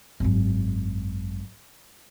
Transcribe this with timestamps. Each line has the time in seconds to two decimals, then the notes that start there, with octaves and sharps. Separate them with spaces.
0.20 G#1 F#2